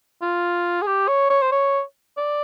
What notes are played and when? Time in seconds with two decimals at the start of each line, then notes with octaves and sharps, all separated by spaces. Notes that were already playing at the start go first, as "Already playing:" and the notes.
0.22 F4
0.82 G#4
0.86 G4
1.08 C#5
1.30 C#5
1.42 C5
1.52 C#5
2.17 D5